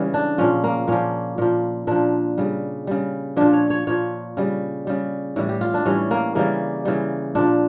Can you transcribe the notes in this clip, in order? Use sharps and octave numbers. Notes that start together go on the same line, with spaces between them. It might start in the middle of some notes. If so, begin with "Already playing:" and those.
Already playing: C#3 E3 G3
D4
A#2 F3 C#4
A#3
A#2 F3 C#4
A#2 F3
A#2 F3 D4
C#3 G3
C#3 G3
A#2 F3 D4
C#5
C#5
A#2 F3 C#5
C#3 G3
C#3 G3
A2 E3 G3
G4
F4
D4
A2 E3 G3 C#4
A#3
C#3 E3 G3 A#3
C#3 E3 G3
A#2 F3 D4